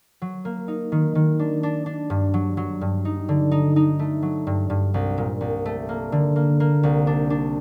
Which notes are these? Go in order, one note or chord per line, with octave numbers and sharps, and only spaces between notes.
F#3
A#3
D#4
D#3
D#3
D4
D4
D4
G2
F#3
F#3
G2
D#4
D3
D#4
D#4
A3
F#3
G2
G2
C2
A#2
C2
A3
A#3
D3
A#3
A#3
C2
D4
D4